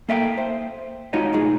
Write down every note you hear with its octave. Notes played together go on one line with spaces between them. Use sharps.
A#3 A4 E5 F5 G5
C5
G#3 D#4 F4 F#4 C#5 D#5
B1 A2 D#4 G#4